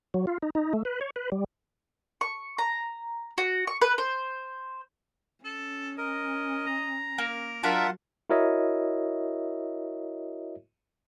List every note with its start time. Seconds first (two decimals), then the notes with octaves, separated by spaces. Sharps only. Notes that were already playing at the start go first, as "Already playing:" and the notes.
0.14 F#3
0.27 F4
0.42 D#4
0.55 D#4
0.73 A3
0.85 B4
1.01 C#5
1.16 B4
1.32 G3
2.21 C#6
2.58 A#5
3.38 F#4
3.67 C#6
3.82 B4
3.98 C5
5.44 C#4 A4
5.98 A#4 D#5
6.66 A#5
7.18 A#3 A#4
7.63 F#3 D4 F4 A#4 E5 F#5 A5
8.30 E4 F#4 A#4 C#5 D#5 E5